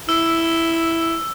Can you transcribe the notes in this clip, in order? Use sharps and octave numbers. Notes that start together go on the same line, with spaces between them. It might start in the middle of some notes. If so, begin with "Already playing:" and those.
E4 E6